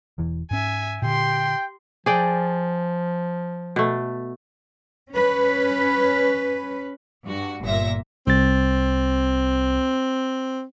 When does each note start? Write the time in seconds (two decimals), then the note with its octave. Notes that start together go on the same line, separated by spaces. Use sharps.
0.18 E1 E2 E3
0.51 G#2 C#4 E5 G#5
1.02 A#2 D3 G4 G5 C6
2.06 F3 G#4 D5 G5
3.76 B2 A3
5.10 C#4 B4
7.24 G2 F#4
7.63 G1 A#2 E5 A#6
8.27 C2 C4 A6